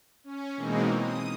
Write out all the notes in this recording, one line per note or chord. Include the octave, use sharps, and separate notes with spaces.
C#4
B2 E3 G#3 A#3 C4 D#4
D#6